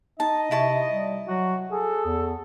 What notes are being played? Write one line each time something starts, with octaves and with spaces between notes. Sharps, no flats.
D#4 D#5 A5
C3 E4 A5 C#6
G3
F#3 F#4
G#4 A4
E2